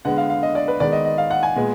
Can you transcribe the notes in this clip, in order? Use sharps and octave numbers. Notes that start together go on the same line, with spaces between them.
D3 G#3 B3 F#5
F5
F5
D#5
D5
B4
D#3 G#3 B3 D5
D#5
D#5
F5
F#5
G#5
A#2 G#3 B3